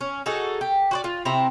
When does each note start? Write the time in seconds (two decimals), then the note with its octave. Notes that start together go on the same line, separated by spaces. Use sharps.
0.01 C#4
0.26 D#4 F#4 G#4 A4
0.61 G4
0.91 F#4 C5 D5
1.04 F4
1.25 C3 C4 E4 A#5